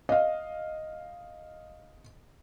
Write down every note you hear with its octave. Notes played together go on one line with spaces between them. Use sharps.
D#5 F5